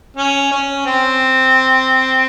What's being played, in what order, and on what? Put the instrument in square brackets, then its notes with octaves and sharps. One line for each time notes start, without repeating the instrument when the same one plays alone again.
[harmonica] C#4
C#4
C4